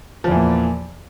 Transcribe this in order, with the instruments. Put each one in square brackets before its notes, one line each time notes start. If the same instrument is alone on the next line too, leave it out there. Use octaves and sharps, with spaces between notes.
[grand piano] F3
E2
E3
A#2